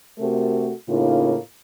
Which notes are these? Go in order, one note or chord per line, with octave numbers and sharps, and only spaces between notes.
C3 A3 F#4 A4 A#4
A2 C#3 A#3 D#4 F4